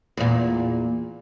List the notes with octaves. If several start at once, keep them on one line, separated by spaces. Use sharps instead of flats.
E2 A#2